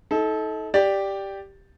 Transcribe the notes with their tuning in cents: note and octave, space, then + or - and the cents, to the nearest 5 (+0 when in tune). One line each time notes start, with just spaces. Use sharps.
D#4 +35 A4 -20
G4 +0 D5 +0